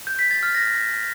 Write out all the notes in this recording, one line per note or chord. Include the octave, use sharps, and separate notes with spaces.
G6
B6
A6
F6
A#6